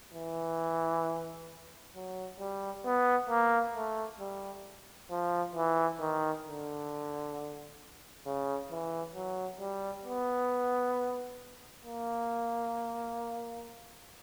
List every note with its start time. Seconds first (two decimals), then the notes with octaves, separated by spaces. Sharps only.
0.14 E3
1.95 F#3
2.40 G3
2.85 B3
3.29 A#3
3.75 A3
4.20 G3
5.11 F3
5.55 E3
6.00 D#3
6.45 D3
8.26 C#3
8.71 E3
9.15 F#3
9.60 G3
10.05 B3
11.85 A#3